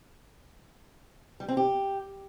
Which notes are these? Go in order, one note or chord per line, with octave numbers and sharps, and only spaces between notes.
G3
C4
G4